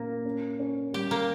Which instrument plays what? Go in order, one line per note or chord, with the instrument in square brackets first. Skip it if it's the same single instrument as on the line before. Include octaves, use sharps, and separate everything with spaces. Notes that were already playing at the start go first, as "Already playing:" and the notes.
Already playing: [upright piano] A#2 C#4 [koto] A#3
[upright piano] C#4
C#4
[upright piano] G3 [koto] G4
[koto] A#3